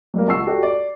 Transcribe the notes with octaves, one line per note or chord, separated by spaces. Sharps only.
F#3 G3 A#3
C#2 F#5 A5 C#6 E6 C7
F#4 G4 A4 D5
D5